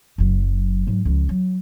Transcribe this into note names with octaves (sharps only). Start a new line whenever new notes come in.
F#1 F#3
G#2 F#3
C#2 F3
F#3